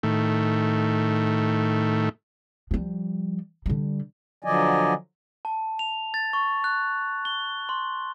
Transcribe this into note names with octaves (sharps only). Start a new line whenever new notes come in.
A2 D#3 A3
F3 G3
D3 G3
D3 F3 F#3 D5 D#5 G#5
A5
F7
A6
C#6
F#6
G7
C6